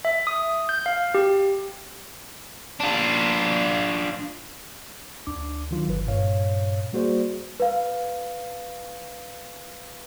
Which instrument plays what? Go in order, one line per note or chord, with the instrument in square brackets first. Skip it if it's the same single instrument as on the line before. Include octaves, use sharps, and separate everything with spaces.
[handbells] E5
D#6
G6
F5
G4
[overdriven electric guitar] D4 F4
[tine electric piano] D2 D4 D6
D#3 F#3 F4
G1 B4
G2 A#2 C#5 F5
G3 A#3 F#4 G#4 C5 D5
[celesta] B4 F5